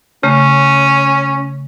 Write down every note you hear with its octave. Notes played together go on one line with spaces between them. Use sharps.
C#3 A3 C#4